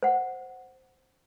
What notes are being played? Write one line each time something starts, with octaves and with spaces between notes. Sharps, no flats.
C5 F#5